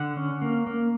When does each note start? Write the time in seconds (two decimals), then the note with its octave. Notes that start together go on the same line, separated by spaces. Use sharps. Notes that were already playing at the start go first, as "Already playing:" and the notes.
Already playing: D3 F#5
0.17 C#4
0.42 A#3
0.67 A#3